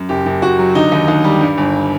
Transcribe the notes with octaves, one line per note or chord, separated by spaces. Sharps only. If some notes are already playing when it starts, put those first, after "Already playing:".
Already playing: F#2
F#1 G4
F#1
F#1 F#4
F#3
D3 D#4
D#2
D#2
G3
G2
G1